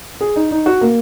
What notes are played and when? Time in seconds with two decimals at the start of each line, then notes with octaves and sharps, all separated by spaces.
0.21 G#4
0.36 D#4
0.51 D#4
0.66 F#4
0.81 A#3